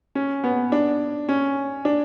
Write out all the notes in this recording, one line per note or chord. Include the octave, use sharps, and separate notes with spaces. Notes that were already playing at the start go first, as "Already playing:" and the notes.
C#4
B3
D4
C#4
D4